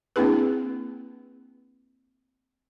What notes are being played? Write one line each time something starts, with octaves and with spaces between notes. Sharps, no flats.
A#3 C4 D4 E4 G#4 B4